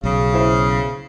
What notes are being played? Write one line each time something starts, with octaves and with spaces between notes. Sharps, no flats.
B1 C#3
E4 C5